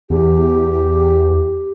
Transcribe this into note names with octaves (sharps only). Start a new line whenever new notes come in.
E2 G4